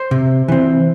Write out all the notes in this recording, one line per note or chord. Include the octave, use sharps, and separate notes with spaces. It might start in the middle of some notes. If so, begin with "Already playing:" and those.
Already playing: C5
C3
E3 C4